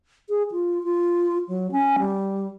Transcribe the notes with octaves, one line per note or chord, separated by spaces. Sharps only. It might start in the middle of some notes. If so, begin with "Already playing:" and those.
G#4
F4
F4
F#3
C#4
G3